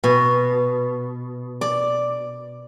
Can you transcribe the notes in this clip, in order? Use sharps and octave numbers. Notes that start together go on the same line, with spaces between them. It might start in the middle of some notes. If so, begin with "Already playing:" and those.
B2
D5